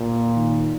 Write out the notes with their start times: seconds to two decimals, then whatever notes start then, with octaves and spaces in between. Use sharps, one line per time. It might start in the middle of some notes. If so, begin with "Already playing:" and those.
Already playing: A#2
0.36 D#3